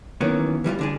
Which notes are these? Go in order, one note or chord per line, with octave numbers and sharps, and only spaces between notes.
D#3 E3 F#3 A#3 B3 C#4
E3 G3 D#4 F4
D3 D4 G#4